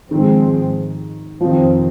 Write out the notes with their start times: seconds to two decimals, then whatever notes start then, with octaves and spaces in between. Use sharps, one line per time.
0.11 G#2 D#3 F3 G#3 C4
1.41 F2 C3 D#3 F3 C4